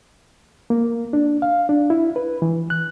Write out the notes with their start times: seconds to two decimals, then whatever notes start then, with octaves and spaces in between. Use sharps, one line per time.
0.70 A#3
1.13 D4
1.42 F5
1.69 D4
1.90 E4
2.16 B4
2.42 E3
2.70 F#6